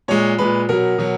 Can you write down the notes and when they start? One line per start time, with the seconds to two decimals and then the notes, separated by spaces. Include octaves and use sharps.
0.08 A#2 G#3 C#5
0.38 A#2 G#3 B4
0.69 B2 F#3 A#4
0.98 B2 F#3